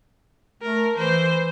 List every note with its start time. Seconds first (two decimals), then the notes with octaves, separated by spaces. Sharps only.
0.63 A3 A#4
0.98 E3 C5